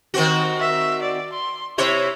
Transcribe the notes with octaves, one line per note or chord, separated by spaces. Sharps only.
D#3 C4 F#4
E5
D5
C6
C3 E4 C5 C#5